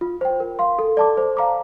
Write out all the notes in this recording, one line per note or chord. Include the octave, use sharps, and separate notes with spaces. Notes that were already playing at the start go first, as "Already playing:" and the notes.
F4
C5 G5
A#4
F5 C6
A4
D5 A5 D6
C5
F5 A#5 D6